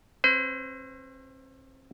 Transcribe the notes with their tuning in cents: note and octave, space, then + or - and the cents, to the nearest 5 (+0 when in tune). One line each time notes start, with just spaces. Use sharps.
C4 +40 C5 -45